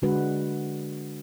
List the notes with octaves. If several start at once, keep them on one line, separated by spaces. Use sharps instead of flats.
D3 G#3 D4 F#4 B4